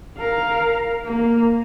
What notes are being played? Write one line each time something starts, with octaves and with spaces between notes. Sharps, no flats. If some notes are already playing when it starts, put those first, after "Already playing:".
A#4 F5
A#3